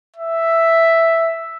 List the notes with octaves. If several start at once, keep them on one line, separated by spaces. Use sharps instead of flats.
E5